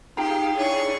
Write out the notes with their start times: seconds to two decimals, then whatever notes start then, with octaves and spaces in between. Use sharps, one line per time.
0.17 D#4 F4 G4 G#4 F5 G5 A#5
0.57 D4 E4 G#4 C#5 C#6